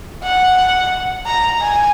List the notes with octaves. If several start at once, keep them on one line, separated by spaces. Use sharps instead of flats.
F#5
A#5
G#5